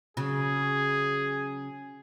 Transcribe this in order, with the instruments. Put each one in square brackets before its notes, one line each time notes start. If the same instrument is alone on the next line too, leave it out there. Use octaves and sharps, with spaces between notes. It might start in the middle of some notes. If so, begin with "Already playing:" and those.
[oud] C#3 F#3 [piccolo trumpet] G#4